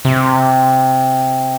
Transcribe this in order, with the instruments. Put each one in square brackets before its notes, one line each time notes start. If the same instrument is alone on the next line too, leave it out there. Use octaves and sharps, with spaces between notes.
[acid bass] C3